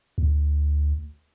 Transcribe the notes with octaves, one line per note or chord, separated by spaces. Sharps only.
D2